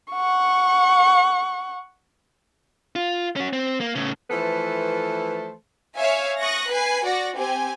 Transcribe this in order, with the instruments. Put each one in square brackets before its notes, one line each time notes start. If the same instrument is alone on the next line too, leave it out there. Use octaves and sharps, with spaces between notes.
[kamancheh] F#5 C#6
[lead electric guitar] F4
C#4 F#4
C4
A#3
A2 C#3
[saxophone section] E3 F3 A3 A4 B4 C5
[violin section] C#5 E5 F5 G#5
C#6 D#6 F#6 A#6
B4 G#5 C7
F#4 D5 A#6
C4 G4 G#5